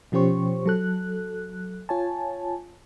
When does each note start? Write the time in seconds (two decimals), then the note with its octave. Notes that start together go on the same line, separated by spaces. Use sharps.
0.12 B2 F3 C#4 G4 C5 C#6
0.66 F#3 A4 F#6
1.89 F4 C#5 G#5 A5